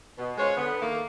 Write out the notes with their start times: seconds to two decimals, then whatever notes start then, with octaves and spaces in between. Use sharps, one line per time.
0.18 B2
0.38 G#3 C#4 F4 C5 C#5
0.57 D3 B3
0.82 D#3 A3 A#3